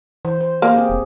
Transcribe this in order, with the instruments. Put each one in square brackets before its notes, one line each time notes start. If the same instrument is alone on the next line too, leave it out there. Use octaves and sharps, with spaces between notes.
[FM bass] E3 [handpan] C5
[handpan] C5
[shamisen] A#3
[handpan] C4 G4 G#4
[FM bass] E1